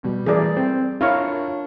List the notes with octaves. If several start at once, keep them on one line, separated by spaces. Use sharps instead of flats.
B2 G3
E3 A3 G#4 A#4 D5
C4
D4 E4 F4 A#4 C#5 F5 C#6